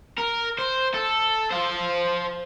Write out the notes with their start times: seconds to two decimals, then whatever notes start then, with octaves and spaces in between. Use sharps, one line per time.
0.18 A#4
0.58 C5
0.94 A4
1.51 C5 F5